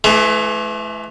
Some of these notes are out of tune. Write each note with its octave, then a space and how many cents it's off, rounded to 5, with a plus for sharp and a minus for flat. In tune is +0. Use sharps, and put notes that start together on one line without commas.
E3 +20 A3 -35